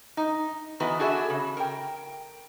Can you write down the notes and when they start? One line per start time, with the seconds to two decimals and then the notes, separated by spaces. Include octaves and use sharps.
0.17 D#4
0.80 D#3 E3 B3 F#4 B4
0.99 D4 F#4 G#4 A4 D#5 E5
1.30 C#3
1.57 A#4 G5